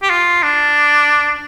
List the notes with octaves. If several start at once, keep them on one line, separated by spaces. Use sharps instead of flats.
G4
F4
D4